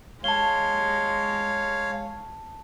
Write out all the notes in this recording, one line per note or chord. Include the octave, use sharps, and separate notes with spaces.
G#3 C#5 F5 A5 G7